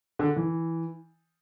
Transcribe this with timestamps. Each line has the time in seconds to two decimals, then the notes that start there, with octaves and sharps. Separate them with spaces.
0.19 D3
0.36 E3